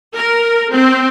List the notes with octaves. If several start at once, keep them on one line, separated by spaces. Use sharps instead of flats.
A#4
C4